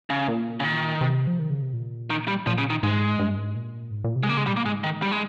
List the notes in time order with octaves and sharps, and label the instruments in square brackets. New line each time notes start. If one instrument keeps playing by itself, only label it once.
[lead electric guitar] C#3
[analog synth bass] A#2
[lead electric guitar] C#3
D#3
[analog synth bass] C3
F3
D#3
C#3
C3
A#2
[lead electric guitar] D#3
G3
[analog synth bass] A#2 [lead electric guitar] F3
[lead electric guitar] C#3
D#3
[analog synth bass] G#2 [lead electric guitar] G#3
[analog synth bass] G2
G#2
A#2
G#2
A#2
C3
[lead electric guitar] G#3
[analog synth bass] C#3 [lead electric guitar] A#3
[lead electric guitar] G#3
[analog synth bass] A#2 [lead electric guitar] G3
[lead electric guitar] A#3
[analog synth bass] G#2 [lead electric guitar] G#3
[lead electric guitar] D#3
G3
G#3